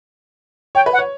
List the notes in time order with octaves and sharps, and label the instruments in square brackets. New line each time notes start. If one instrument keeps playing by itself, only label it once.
[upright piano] C#5 [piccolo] G5
[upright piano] B4
[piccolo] F#5
[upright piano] C#5